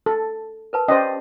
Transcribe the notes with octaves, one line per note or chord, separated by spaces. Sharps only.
A4
A#4 B4 A5
C#4 G4 C5 D5 D#5 G5